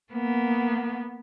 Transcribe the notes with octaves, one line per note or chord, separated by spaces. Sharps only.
A#3 B3